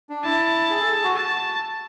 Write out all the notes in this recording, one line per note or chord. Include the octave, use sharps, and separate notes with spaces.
D4
E4 A5
G#4
A4
G#4
F#4
A5